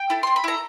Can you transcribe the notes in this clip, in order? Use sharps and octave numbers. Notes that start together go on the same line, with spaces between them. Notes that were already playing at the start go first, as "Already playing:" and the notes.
Already playing: G5
E4 A4
C4 C6
B5
E4 A4 A#5